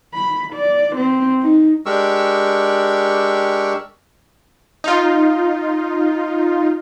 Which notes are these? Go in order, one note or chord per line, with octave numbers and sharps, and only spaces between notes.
B5
D5
C4
D#4
G#3 D4 G4 A#4 C#6 E6
D#4 F4